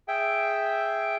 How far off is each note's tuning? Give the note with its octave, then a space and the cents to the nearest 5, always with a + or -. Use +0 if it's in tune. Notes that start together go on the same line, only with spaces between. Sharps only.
G#4 +0 E5 +0 G5 +0